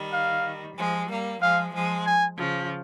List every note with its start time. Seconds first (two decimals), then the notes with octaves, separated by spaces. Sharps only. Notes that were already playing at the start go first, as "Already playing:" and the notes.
Already playing: D#3 G3
0.13 F5
0.77 F3 G#3
1.09 G3 A#3
1.42 F3 G#3 F5
1.74 F3 G#3
2.06 G#5
2.38 C#3 F3